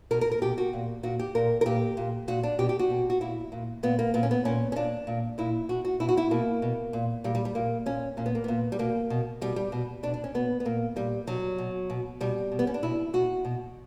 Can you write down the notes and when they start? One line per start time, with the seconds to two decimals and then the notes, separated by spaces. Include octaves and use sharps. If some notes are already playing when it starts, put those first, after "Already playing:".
0.11 B2 A#4
0.21 A#4
0.32 A#4
0.42 B2 G4
0.58 F#4
0.73 A#2
1.03 A#2 F#4
1.19 G4
1.35 A#2 A#4
1.61 A#4
1.66 A#2 G4
1.97 A#2
2.28 A#2 F#4
2.43 D4
2.59 B2 G4
2.69 G4
2.79 F#4
2.90 B2
3.10 F#4
3.21 A#2 E4
3.52 A#2
3.83 A#2 B3
3.99 A#3
4.14 A#2 B3
4.23 C#4
4.31 B3
4.45 A#2 C#4
4.72 C#4
4.76 A#2 D4
5.07 A#2
5.38 A#2 E4
5.69 B2 F#4
5.85 F#4
6.00 B2 E4
6.09 F#4
6.17 E4
6.31 B2 A#3
6.62 B2
6.93 A#2
7.24 A#2 G3
7.35 G3
7.45 G3
7.55 A#2 A#3
7.86 A#2 C#4
8.17 A#2 C#4
8.26 B3
8.35 A#3
8.44 A#2 B3
8.72 G3
8.79 B2 A#3
9.10 B2
9.41 B2 G3
9.56 G3
9.72 B2
10.03 B2 D4
10.14 D4
10.24 C#4
10.34 B2 B3
10.60 B3
10.65 A#2 A#3
10.96 A#2 G3
11.27 B2 F#3
11.58 B2
11.90 B2
12.20 B2 G3
12.52 B2
12.59 B3
12.67 C#4
12.74 D4
12.83 B2 E4
13.13 B2 F#4
13.45 B2